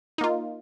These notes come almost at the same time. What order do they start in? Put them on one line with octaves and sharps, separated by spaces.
D#4 A#3 F4